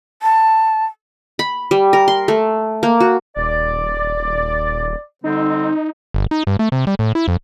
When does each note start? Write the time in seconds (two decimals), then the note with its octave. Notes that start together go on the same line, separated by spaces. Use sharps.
0.23 A5
1.39 B5
1.71 G3
1.93 A#4
2.08 C6
2.28 A3
2.83 A#3
3.00 F#4
3.36 D#1 D5
5.24 D3 G3 C4 D#4
6.14 G1
6.31 D#4
6.47 G2
6.59 A3
6.72 C3
6.87 G3
6.99 A2
7.15 E4
7.28 F2